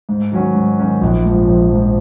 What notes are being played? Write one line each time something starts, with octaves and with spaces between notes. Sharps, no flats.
G#2
D#3 F#3 C#4 F#4
G#2
D#3 F#3 C#4 F#4
A#1
G#2 F3
A#1
G#2 F3